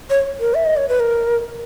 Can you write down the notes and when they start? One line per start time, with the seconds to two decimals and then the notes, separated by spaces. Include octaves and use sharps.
0.10 C#5
0.40 A#4
0.54 E5
0.65 D#5
0.77 C#5
0.89 B4
1.00 A#4